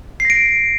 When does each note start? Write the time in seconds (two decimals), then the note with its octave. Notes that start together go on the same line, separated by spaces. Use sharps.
0.20 C7
0.25 A#6
0.30 D7